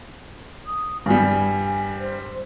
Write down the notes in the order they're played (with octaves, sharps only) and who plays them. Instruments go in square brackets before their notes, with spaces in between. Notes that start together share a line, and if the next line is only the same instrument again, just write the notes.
[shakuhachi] D#6
[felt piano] G2 G3 [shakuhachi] G#5
[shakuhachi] C5